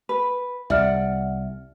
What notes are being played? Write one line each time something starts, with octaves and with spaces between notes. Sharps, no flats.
B4
C2 D5 E5 F#5 F6